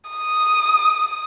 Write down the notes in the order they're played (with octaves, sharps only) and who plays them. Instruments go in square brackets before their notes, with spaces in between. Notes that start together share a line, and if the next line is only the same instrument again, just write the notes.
[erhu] D#6